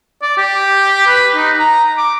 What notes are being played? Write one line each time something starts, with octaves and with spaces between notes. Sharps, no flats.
D5
G4
B4
D#4
A#5
D6